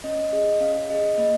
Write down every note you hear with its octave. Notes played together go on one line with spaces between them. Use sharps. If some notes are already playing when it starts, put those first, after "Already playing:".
C#4 D#5
G#4 D#5
C#4 F5
G#4 D#5
A#3 D#5